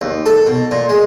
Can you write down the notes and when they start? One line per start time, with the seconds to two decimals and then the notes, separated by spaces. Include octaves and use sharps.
0.01 D#2
0.26 A4
0.47 B2
0.71 A#2
0.89 G#3